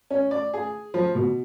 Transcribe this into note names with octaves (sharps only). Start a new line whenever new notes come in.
C#4
D5
G#4
F3
B2